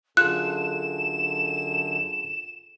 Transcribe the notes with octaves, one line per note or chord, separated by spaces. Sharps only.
F#2 D3 F4 G#4 A4 F#6 E7